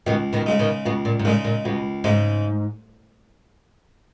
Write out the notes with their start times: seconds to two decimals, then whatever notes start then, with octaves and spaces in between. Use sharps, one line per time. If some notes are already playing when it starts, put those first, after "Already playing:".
0.06 C#2 B2 D#3
0.33 B2 D#3
0.46 C#3 G#3 D#4
0.59 B2 D#3
0.86 C#2 B2
1.05 A#2
1.19 G#2
1.25 A#2 C#3 G#3 D#4
1.45 A#2
1.65 C#2 B2
2.04 G#2 C#3 G#3 D#4